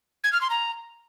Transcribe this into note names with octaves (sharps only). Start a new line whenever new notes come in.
G#6
F6
C6
A#5